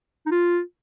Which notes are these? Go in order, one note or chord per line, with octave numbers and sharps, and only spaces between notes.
D#4
F4